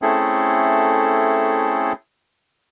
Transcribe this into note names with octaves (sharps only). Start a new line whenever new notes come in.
A3 C4 C#4 E4 G#4 A4